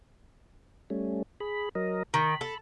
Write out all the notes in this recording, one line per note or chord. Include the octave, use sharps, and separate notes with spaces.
G3 A3 C#4
G#4 B5
F#3 A#4 D#5
D#3 B5
A4